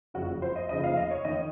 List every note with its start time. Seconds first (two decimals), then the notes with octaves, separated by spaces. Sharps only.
0.14 F#1 F2 C#3 F#4
0.42 C5
0.56 D#5
0.69 F1 D#2 C#3 F3 D#5
0.84 F5
0.97 D#5
1.11 C#5
1.25 D#3 D#5